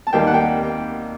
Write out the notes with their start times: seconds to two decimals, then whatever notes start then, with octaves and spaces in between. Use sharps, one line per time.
0.07 A5
0.13 D#2 D#3 G3 A#3 G5
0.27 F#5
0.34 G5